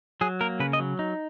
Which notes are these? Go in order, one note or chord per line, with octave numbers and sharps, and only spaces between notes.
F#3 G#4
A#3 A#4
C#3 B4
D#5
F#3
D#4